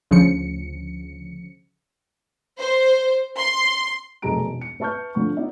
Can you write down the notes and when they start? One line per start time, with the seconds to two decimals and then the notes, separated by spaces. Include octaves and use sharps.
0.11 D2 C#3 F3 C#7
2.60 C5
3.38 C6
4.22 F1 B1 A3 G#4 A#5 D7
4.46 E1
4.61 C#7
4.80 B4 E5 A5 C#6 F6 G6
5.15 D3 F3 C#6
5.36 B3 D#4 F4 D5 E5